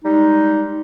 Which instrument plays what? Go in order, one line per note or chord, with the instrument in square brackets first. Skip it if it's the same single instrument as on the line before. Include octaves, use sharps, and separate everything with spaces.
[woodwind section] G3 G#3 D#4